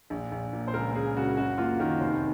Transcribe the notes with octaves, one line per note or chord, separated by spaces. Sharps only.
A#1
A#1
A#2
C5
C#2 A#4
C#2 G#4
C#3 F#4
F#2 F#4
A#3 F4
D#3 A#4
F1 C5